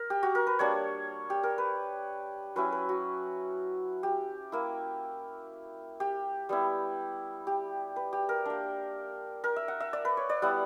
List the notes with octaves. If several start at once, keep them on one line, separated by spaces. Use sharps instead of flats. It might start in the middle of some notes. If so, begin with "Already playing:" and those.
Already playing: A#4
G4
F#4
A#4
B4
G3 A#3 D4 C#5
G4
A#4
B4
F#3 C#4 E4 B4
B4
F#4
G4
A#3 E4
G4
G3 B3 E4
G4
B4
G4
A#4
A#3 D4
A#4
E5
F#5
E5
D5
B4
C#5
D5
G3 B3 E4 F#5